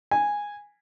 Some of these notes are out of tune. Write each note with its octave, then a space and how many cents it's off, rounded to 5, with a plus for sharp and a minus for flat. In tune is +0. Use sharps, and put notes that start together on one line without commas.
G#5 -10